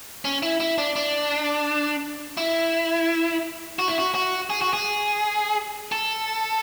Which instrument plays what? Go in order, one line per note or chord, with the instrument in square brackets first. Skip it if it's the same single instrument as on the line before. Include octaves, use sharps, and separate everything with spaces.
[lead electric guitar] C#4
E4
E4
D4
D4
E4
F#4
E4
F#4
F#4
G#4
F#4
G#4
A4